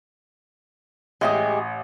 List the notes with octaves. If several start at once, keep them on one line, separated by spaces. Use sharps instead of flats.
A1 G#3 G4 G#4 E5 D#6